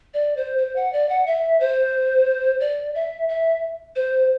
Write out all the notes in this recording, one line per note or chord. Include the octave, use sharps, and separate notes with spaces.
D5
C5
C5
F#5
D5
F#5
E5
C5
D5
E5
E5
C5